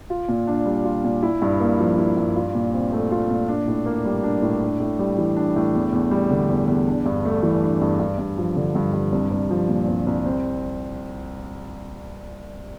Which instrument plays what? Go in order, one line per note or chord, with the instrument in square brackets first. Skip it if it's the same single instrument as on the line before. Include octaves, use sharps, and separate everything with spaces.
[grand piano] F4
A#2
D4
G3
F4
A#2
E4
G2
A#3
F3
E4
G2
F4
A#2
C4
A3
F4
A#2
D4
A2
A#3
G3
D4
A2
D4
A2
G3
E3
D4
A2
E2
E2
G3
D3
E2
E2
D4
G2
A3
E3
D4
G2
G2
G2
F3
D3
G2
G2
C2
C2
F3
A#2
C2
C2
C4